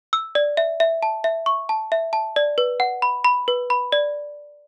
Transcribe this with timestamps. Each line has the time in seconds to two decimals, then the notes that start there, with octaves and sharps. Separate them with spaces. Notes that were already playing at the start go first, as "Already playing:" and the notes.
0.13 E6
0.35 D5
0.57 E5
0.80 E5
1.03 A5
1.24 E5
1.46 C#6
1.69 A5
1.92 E5
2.13 A5
2.36 D5
2.58 B4
2.80 F#5
3.02 B5
3.25 B5
3.48 B4
3.70 B5
3.92 D5